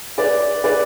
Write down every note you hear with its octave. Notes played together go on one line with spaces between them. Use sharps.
B4 D5
B4 D5